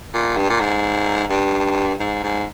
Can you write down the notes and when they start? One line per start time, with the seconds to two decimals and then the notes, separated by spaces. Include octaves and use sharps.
0.14 A#2
0.37 G2
0.50 A#2
0.61 G#2
1.30 G2
2.00 G#2
2.23 G#2